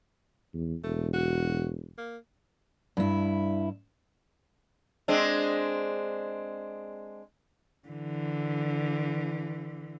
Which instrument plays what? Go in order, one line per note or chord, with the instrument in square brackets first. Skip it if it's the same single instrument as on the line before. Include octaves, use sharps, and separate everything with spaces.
[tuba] E2
[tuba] E1 [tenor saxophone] A3
[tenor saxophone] F#4
A#3
[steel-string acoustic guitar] G2 E4
[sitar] G#3 C4 D4
[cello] D3 E3